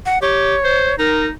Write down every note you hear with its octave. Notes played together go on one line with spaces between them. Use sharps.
F#5
G4 C#5
C5
D#4 A#4